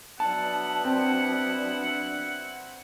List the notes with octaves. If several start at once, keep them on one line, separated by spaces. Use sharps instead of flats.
F#3 B3 D4 E4 F#5 A5
C4